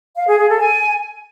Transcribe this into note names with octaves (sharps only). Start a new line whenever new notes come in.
F5
G#4
G#4
A4
G#5